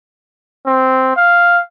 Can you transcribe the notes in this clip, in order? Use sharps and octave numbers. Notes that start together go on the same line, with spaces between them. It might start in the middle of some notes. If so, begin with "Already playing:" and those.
C4
F5